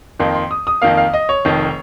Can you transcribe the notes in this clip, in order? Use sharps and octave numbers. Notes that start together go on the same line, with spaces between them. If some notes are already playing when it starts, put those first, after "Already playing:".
F2 D#3 A#3 C6
C6
D#6
D#6
F2 D#3 A#3 F5
F5
D#5
C#5
F1 F2 D#3